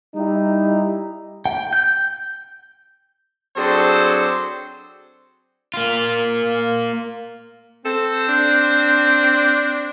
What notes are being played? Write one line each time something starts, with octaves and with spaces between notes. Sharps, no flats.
G3 D#4 E4 G4
G5
G6
F#3 C4 D4 G#4 A4 C5
A#3 F4
C4 A4
D4